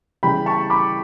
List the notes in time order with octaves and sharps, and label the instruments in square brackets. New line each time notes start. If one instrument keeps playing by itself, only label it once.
[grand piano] C#3 E3 G3 G5 B5
A5 C#6
B5 D6